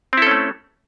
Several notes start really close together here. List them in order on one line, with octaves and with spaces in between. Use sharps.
C4 E4 A4 C#4 A3